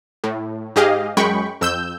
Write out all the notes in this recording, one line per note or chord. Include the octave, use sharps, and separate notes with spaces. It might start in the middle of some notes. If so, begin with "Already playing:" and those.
A2
G#2 G4 G#4 D#5 F5
F#2 G#3 G5 B5 C#6
F2 E6 G6